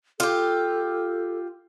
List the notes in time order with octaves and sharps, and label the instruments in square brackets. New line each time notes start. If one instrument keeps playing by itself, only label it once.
[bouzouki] F4 G4 [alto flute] A4